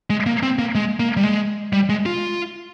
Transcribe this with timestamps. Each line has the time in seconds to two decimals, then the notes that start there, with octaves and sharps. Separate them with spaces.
0.10 G#3
0.26 A#3
0.43 C4
0.59 A#3
0.75 G#3
1.00 A#3
1.17 G3
1.23 G#3
1.73 G3
1.89 G#3
2.06 F4